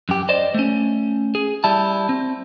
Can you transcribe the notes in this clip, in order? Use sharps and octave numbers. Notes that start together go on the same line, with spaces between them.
F#2 G4
C5 D5 D#5
A3 C#4
G#4
G3 E4 A5
C4